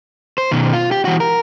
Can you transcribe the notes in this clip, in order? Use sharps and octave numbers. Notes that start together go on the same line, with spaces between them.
C5
B2 D#3
F4
G4
E3 F#4
A#4